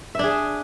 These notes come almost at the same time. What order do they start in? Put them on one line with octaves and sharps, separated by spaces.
E5 D4 G#4